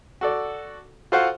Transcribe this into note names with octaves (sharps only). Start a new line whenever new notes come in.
F#4 A4 D5
F4 F#4 A4 C5 F5 F#5